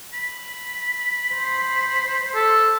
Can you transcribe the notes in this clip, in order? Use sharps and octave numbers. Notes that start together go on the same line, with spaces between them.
B5
C5
A4